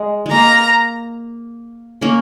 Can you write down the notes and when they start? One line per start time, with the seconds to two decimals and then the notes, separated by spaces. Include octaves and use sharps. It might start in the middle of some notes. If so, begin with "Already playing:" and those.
Already playing: G#3
0.26 G#3
0.31 A#3 A#5
2.01 A#3 C#4